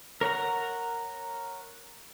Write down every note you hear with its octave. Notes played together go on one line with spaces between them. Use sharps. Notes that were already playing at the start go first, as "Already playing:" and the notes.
A#4 C#5 F#5 A#5